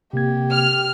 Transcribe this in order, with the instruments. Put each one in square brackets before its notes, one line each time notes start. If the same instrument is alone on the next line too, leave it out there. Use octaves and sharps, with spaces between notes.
[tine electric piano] C3 A#3 G#6 [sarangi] G4
[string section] F6